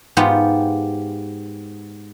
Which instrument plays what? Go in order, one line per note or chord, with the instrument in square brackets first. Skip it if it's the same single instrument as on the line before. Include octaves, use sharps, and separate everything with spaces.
[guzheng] G#2 B3 F4 G4